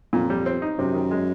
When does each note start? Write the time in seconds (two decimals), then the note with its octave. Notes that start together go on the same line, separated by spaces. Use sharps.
0.13 F2 A#2
0.30 G3
0.46 C4
0.62 D#4
0.78 F#2 C3
0.94 D#3
1.11 G#3